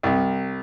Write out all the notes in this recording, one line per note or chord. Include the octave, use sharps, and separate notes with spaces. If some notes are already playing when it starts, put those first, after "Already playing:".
C2